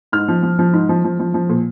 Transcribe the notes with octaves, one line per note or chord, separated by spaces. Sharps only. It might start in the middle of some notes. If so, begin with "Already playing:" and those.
G#2 F6
F3
F3
F3
G#2
F3
F3
F3
F3
A#2